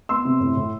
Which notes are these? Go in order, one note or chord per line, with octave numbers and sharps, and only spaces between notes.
B3 C6 E6
C3
A2
A2